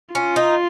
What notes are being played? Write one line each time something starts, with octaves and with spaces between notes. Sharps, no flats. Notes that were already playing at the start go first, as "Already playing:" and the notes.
C#4 F4
D#4